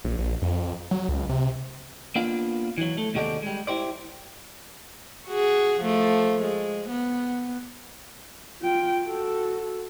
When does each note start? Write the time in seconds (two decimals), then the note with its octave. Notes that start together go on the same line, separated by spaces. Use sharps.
0.05 A#1
0.19 A#1
0.42 F2
0.91 F#3
1.09 C#2
1.29 C3
2.16 A#3 B3 D4 F4
2.78 E3 F#3
2.98 A3
3.14 D#2 C3 G#3 F#4 A4 D5
3.42 G3 G#3
3.67 E4 G4 C5 D5
5.26 F#4 G#4
5.80 F3 A3
6.41 G#3
6.89 B3
8.62 F4 G5
9.06 F#4 A4